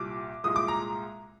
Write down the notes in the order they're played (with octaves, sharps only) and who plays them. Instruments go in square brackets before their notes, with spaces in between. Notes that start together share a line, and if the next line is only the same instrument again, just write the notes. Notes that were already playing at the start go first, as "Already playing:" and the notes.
Already playing: [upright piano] C2 A#2 G3 D6
C2 A#2 G#3 D#6
D6
A#5